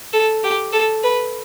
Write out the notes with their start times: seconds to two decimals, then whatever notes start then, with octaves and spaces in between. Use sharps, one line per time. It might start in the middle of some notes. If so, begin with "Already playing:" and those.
0.13 A4
0.43 G4
0.72 A4
1.03 B4